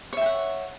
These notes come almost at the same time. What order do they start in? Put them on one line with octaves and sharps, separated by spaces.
C#5 E5 G5 F#5